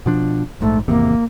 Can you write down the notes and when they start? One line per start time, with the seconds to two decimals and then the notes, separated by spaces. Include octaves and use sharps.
0.06 B2 F3 D4
0.61 A#1 G#2 A3
0.88 G#1 E2 C3 A#3